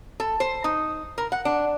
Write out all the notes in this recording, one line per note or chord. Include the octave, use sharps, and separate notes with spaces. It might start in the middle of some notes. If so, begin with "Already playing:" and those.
A4
C5
D#4
A#4
F#5
D4